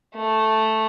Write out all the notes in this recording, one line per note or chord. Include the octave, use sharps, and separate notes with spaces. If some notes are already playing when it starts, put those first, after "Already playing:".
A3